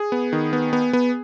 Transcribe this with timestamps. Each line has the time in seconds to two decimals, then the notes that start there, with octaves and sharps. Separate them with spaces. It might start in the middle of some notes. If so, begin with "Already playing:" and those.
Already playing: G#4
0.12 B3
0.33 D#3
0.53 B3
0.73 B3
0.93 B3